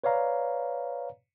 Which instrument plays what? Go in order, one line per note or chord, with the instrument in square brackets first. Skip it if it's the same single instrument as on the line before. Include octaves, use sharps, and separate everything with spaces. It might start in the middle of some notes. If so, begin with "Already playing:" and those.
[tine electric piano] B4 C#5 D5 F5 A#5